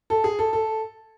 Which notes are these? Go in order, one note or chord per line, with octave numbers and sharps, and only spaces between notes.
A4
G#4
A4
A4